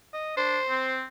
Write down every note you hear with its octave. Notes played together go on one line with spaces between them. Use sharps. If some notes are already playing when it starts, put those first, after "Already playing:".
D#5
D4 C5
C4